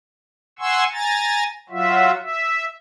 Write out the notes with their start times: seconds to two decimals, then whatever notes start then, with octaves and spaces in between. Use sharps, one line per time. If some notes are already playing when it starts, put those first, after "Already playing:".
0.59 F#5 G#5 C6 C#6 E6
0.92 G#5 A#5 A6
1.69 F#3 F4 F#4 E5
2.21 E5